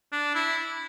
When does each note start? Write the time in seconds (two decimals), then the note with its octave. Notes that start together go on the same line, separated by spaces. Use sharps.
0.12 D4
0.35 E4